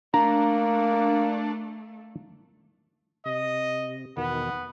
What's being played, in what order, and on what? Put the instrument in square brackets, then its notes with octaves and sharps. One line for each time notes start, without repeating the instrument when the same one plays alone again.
[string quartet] A3 [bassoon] A#3 [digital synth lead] D4 [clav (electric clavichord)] A#5
[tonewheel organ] C3 [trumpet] D#5
[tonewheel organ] E2 B2 D#3 [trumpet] B3